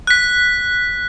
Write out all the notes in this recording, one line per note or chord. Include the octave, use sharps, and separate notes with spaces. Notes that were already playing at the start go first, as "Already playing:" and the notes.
F#6 B6